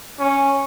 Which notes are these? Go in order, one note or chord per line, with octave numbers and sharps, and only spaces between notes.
C#4